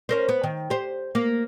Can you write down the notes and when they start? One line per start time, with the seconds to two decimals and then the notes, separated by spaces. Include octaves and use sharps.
0.09 C#4 A#4 C5
0.29 B3
0.44 D#3
0.70 G4 C5
1.15 A#3